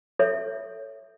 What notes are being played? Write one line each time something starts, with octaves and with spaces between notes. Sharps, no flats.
A4 C#5 E5